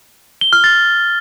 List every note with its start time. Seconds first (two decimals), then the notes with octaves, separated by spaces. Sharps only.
0.41 G7
0.53 F6
0.64 A6